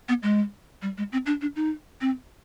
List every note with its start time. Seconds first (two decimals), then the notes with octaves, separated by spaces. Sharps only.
0.09 B3
0.23 G#3
0.82 G3
0.98 G#3
1.12 C4
1.26 D4
1.41 D4
1.56 D#4
2.01 C4